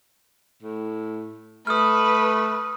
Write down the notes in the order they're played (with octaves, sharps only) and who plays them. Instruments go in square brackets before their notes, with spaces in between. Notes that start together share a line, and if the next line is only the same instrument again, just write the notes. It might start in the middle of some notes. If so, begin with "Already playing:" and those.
[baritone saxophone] A2
[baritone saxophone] A3 [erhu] B4 [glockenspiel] D#6 F6